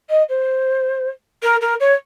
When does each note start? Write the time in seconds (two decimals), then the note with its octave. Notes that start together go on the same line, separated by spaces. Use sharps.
0.10 D#5
0.29 C5
1.43 A#4
1.61 A#4
1.80 C#5